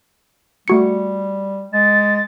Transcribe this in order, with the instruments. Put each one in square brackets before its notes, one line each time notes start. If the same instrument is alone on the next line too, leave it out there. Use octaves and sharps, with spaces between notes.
[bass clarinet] G3 [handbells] A3 F#4 C#7
[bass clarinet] G#3 [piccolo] A6